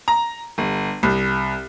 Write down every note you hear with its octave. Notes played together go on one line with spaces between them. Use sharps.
A#5
G1
C2